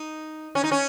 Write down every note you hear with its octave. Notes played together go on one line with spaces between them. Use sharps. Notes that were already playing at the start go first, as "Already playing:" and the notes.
Already playing: D#4
C#4
D#4
C#4